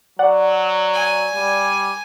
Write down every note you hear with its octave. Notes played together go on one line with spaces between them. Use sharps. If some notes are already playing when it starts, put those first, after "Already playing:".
F#3 D5 F#5
G#5
G3